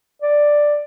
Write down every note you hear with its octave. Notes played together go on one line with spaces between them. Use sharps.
D5